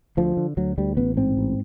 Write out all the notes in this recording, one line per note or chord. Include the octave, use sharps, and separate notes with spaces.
D2 F3
D3
D2 F#3
D2 G3
A1 B3
G#2 C4
A1